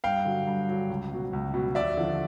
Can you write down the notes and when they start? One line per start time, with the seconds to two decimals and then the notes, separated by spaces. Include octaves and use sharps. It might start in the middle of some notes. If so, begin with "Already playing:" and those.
0.04 G2 F5 G5
0.25 D3 F#3
0.47 G2
0.69 D3 F#3
0.90 C#2
1.12 B2 F#3
1.33 C#2
1.54 B2 F#3
1.75 D#2 D5 E5
1.97 D3 F3